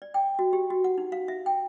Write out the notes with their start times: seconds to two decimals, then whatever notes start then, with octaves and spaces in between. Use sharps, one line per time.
0.02 D5
0.14 G5
0.39 F#4
0.53 G4
0.70 F#4
0.84 F#5
0.98 D#4
1.12 F5
1.28 E5
1.46 G5